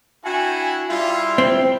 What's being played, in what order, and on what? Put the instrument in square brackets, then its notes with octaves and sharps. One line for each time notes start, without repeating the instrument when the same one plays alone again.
[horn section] D4 E4 F#4 [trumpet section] G5 G#5
[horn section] G3 F4 [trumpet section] E4 E5
[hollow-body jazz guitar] C4